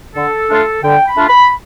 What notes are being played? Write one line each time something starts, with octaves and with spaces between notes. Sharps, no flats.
D3 A4
A3 D4 F4
D3 G5
B5
A3 D4 F4
B5